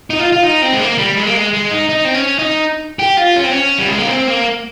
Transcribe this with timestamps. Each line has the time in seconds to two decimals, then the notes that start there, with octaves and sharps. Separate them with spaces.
0.10 D#4
0.19 F4
0.32 F4
0.43 D#4
0.62 C4
0.73 G#3
0.80 A#3
0.98 G3
1.16 G#3
1.26 A#3
1.34 G#3
1.53 G#3
1.71 D#4
1.89 D#4
2.05 C4
2.14 C#4
2.39 D#4
2.99 G4
3.17 F4
3.36 C#4
3.44 C4
3.51 C#4
3.79 G3
3.89 G#3
3.98 A#3
4.09 C4
4.27 A#3